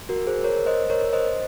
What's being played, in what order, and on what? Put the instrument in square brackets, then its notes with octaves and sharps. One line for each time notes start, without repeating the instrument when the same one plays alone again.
[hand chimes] F#4 A#4
G#4 C5
A#4 C#5
C5 D#5
A#4 C#5
C5 D#5